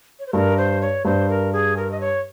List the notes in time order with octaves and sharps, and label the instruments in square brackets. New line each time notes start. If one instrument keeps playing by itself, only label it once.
[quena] C#5
C5
[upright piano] G2 [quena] A#4
[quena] C5
C#5
[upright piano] G2 [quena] C5
[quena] A#4
G#4
A#4
D#5
C#5